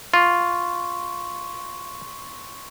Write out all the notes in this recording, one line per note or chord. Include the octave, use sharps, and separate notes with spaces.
F4 C6 C#6